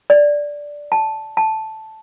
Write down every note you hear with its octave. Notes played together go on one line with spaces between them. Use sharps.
D5
A5
A5